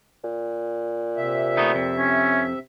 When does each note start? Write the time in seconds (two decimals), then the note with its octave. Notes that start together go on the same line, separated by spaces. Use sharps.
0.24 A#2
1.17 C3 E5
1.57 A3 B3 D#4
1.75 F2
1.98 C#4